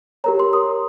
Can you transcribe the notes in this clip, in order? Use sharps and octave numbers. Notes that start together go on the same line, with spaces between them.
G4 A#4 C#5 A#5
C6
D#6